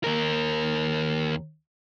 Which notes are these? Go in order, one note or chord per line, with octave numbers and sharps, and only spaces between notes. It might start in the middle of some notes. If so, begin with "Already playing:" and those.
D#2 A#4